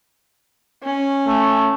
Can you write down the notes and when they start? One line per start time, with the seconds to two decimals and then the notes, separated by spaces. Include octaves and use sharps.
0.84 C#4
1.27 A3